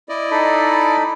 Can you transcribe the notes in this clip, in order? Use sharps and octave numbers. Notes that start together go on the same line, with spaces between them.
E4 D5 D#5
D#4 A4 B5